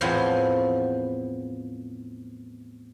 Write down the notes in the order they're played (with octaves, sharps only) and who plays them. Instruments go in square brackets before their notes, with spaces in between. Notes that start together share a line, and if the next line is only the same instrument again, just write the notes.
[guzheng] E2 A2 F3 B3 C4 G#5